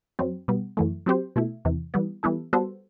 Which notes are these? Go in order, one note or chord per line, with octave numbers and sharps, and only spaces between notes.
F#2 F#3 C4
B2 G3 B3
F#2 E3 A3
F#3 C4 G4 C5
B2 A3 E4
E2 C3 E3
E3 G3 B3
E3 G3 B3 E4 A4
G3 B3 F#4 A4 C5